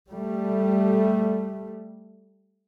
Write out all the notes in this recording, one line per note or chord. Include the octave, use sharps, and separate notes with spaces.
G3 A3